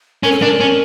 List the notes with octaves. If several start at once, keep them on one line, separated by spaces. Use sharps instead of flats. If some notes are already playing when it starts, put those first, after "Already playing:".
C#4 A#4
A4
D4 A#4
C#4